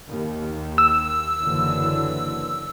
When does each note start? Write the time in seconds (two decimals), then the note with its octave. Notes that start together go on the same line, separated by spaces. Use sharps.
0.11 D#2
0.78 E6
1.41 F#1 D3 E3